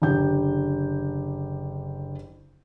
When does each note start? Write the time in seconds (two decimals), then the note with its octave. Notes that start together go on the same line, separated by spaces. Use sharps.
0.02 F#1 D3 G4 G6